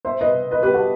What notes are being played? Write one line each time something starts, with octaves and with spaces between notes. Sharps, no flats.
C5 E5
B4 D#5
B4 D#5
G4 B4
F#4 A4